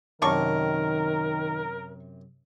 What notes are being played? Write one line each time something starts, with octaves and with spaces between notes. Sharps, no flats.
F#2 C3 D#3 D4 A#4 C#6